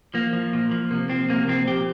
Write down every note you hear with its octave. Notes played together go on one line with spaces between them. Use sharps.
F3 A#3
F3
A#2
F3
C3 A#3
F3 C4
C3 A#3
F3 C4
A#2 G4